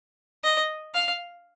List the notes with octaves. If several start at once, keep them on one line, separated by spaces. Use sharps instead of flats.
D#5
F5